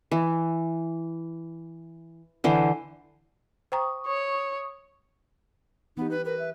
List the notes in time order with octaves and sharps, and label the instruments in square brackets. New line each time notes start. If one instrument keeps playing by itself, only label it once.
[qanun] E3
D3 E3 C5
[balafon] C5 G5 A#5 [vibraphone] C#6 D#6
[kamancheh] C#5
[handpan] E3 G4 [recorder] B3 [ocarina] D#4
[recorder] B4
[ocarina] A#4 [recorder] B4
[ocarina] E5